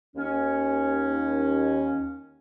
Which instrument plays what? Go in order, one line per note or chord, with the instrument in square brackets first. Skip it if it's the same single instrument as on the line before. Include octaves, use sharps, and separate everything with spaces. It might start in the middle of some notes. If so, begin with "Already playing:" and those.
[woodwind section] D#2 C#4